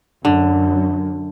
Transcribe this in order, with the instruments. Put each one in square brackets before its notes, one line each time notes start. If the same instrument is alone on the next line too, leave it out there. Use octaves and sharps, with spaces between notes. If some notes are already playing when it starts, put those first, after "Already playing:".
[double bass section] F#2 [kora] D3